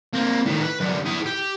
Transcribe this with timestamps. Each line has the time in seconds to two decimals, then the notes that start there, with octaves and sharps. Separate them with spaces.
0.13 A#3 C4
0.46 A2 D#3
0.62 B4
0.80 F#2 D3
1.06 E4 G#4
1.26 G4